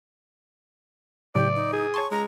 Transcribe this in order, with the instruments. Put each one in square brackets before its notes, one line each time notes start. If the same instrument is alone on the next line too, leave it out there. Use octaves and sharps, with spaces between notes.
[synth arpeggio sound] A2 C#3 F#3 [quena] G4 [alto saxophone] D5
[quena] D#4
[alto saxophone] G#4
[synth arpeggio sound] C#5 A5 C6 [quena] C#6
[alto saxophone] G#3 [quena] A#5